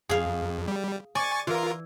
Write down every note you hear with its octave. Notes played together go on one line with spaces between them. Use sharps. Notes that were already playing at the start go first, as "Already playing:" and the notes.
F2 G#4 F5
G3
D5 G#5 C#6 A6
E3 F4 A#4